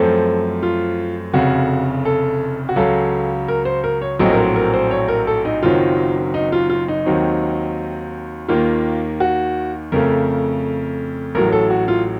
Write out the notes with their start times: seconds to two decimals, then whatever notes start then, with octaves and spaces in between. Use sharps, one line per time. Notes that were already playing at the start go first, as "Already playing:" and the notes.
Already playing: F#2 F3 A3 C4 A4
0.63 F4
1.33 F1 F2 C#3 F#4
2.05 A4
2.69 F#4
2.76 C#2 C#3 F#3 A4
3.48 A#4
3.65 C5
3.84 A#4
4.02 C#5
4.19 A#1 A2 F#3 C4 D#5
4.33 A#4
4.37 C5
4.56 A#4
4.74 C5
4.91 C#5
5.08 A#4
5.27 A4
5.45 D#4
5.62 F#1 F#2 D#3 F#3 C4 F4
6.34 D#4
6.52 F4
6.69 F4
6.88 D#4
7.06 D#2 D#3 F#3 C4
8.48 D#2 D#3 A#3 F4
9.20 F#4
9.92 F2 C#3 A3 A#4
11.35 A1 A2 F#3 A#4
11.52 A4
11.70 F#4
11.88 F4